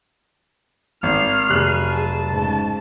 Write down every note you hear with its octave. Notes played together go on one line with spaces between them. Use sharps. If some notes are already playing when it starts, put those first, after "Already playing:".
G#1 F6 C7
F1 F#3 G#4 F#6
A5
G#2 C#3